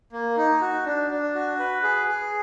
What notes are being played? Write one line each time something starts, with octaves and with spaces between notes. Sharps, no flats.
A#3
D#4
F#4
D4
D4
F#4
B4
G#4
G#4